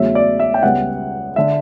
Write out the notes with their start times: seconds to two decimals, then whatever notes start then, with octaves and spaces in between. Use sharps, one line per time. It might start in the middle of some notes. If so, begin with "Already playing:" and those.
Already playing: E2 C#3 F#3 A3 E5
0.15 D5
0.40 E5
0.54 G5
0.63 C#2 C#3 G3 B3 F#5
1.36 D3 E5